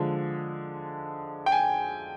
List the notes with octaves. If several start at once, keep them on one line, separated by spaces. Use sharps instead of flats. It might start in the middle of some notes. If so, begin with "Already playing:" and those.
Already playing: D3 F3 G#3
G5
G#5